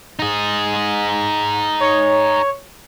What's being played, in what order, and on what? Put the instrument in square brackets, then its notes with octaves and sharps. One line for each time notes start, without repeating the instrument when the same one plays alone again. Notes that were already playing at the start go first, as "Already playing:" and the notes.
[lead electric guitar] D#4 G#4
[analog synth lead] C#5